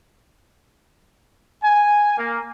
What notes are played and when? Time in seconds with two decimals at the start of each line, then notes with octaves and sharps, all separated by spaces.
1.64 G#5
2.18 A#3